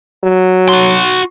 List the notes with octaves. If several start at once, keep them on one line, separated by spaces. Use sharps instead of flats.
F#3
F#4 C6